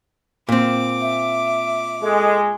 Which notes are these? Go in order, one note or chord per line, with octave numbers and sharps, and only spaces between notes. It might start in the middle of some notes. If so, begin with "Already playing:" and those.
A#2 C4 D6
E5
G#3 A4